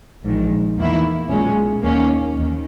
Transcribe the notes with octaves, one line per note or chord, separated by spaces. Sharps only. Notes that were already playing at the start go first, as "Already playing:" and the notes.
A#1 G#2 D#3
E2 D#3 A#3 E4
B1 A#2 G#3 C#4
D#2 D#3 A#3 C#4
D#2 D#3